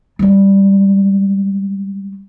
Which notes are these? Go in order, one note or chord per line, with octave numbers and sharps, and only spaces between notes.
G3 G#3